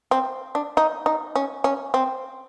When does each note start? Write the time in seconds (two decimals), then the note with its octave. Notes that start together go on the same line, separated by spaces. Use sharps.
0.11 C4
0.55 D4
0.77 D#4
1.06 D#4
1.36 C#4
1.64 C#4
1.94 C4